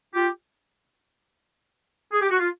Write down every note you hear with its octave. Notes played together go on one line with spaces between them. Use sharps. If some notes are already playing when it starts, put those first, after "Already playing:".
F4 G4
G#4
G4
F#4
F4